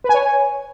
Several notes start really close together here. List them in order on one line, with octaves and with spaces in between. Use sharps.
B4 G#5 C#5